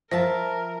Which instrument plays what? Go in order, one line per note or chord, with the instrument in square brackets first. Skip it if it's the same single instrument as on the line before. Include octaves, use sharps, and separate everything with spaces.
[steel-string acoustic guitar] F3 E5 A5 [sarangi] A#4 [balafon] C5